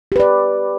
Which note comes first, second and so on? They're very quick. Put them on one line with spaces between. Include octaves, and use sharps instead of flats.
G4 B4 D5